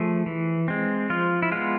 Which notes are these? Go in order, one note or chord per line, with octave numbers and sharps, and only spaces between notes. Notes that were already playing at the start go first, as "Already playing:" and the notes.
Already playing: F3 A3 G#4
E3
G#3 C4
F3 F4
E4
G#3 B3 F4